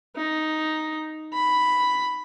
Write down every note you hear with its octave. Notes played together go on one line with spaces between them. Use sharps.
D#4
B5